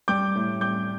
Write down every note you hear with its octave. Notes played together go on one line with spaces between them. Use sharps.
G3 D6 G6
A2
G3 D6 G6